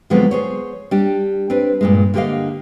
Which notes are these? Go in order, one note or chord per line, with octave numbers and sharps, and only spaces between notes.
D3 F3 F#3 G#3 B3 C4
G#4 C5 C#5
G3 D4 G4
C4 D4 B4
G2 A#2 G#3
D3 A#3 G4 A#4 D#5 F5